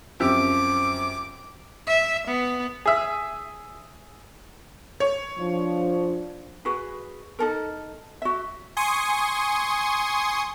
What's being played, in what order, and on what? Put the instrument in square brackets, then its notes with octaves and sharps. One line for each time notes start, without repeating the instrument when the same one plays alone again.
[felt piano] F#2 C4 [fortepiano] F3 G4 E6 [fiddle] D6
[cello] E5
B3
[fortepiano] G#4 E5
[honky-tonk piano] C#5
[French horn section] F3 D4
[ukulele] F#4 G#4 B4
D#4 A4 A#4
F#4 E5
[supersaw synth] G#5 C6 C#6 D#6